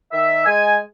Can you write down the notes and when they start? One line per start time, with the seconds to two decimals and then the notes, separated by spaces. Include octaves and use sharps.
0.13 D#3 E5
0.46 G#3 G#5